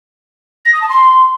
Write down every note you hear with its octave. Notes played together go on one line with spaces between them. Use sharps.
A#6
D#6
A5
C6